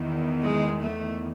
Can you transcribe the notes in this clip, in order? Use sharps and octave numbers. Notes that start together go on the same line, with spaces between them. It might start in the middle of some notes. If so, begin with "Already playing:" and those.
Already playing: E2 D#3
G#3
A3